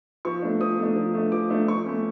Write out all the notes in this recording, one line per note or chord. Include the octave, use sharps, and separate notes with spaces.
F3 C#6
A3 D4
F3 D#6
A3 D4
F3
A3 D4
F3 D6
A3 D4
F3 C#6
A3 C#4